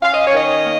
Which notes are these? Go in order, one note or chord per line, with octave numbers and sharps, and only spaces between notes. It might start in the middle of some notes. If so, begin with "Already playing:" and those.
C#4 F5
D#5
C#5
D#3 D#5
A#3